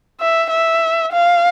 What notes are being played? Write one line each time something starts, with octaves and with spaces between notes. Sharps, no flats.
E5
E5
F5